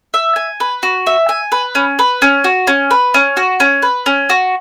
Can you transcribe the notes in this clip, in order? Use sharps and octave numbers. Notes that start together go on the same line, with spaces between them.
E5
G#5
B4
F#4
E5
G#5
B4
C#4
B4
C#4
F#4
C#4
B4
C#4
F#4
C#4
B4
C#4
F#4